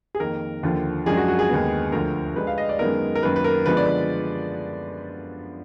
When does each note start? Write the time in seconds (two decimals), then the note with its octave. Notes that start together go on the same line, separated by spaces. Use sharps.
0.15 G#4
0.20 F2 D#3 A#3 A#4
0.63 D#2 D3 F3
1.06 F#2 F3 G#3 D4 G#4
1.17 F#4
1.28 F#4
1.39 G#4
1.49 D#2 D3 G#3 B3
1.92 D2 D3 F3 A#4
2.36 D3 G#3 D4 B4
2.47 F5
2.58 D#5
2.69 D5
2.79 F#2 D#3 G#3 B3 D#4 A#4
3.15 A#4
3.23 F#2 D#3 A#3 B4
3.36 B4
3.44 A#4
3.66 D3 F3 G#3 B3 B4
3.77 D5
3.87 B4